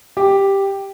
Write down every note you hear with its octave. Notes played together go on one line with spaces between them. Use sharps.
G4